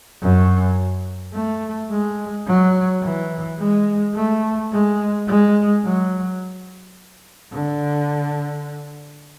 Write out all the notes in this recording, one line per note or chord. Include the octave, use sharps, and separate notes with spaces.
F#2
A3
G#3
F#3
E3
G#3
A3
G#3
G#3
F#3
D3